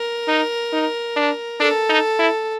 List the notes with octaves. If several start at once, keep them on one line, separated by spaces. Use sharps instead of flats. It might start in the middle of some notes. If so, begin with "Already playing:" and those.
Already playing: A#4
D#4
D#4
D4
D4 A4
D#4
E4